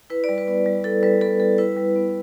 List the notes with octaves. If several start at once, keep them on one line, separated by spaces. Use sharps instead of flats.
E4 B4
D5
G3
B4
B3
G3
E4 A4
G3 B4
B3 A4
G3 A4
E4 B4
G3
B3